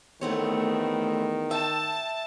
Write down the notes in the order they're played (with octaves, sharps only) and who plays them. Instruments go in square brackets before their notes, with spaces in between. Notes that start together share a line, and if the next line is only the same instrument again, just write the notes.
[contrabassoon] E2 [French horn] D#3 [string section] A3 [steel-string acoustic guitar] B3 C4 C#5
[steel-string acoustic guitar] E5 G5 [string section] A5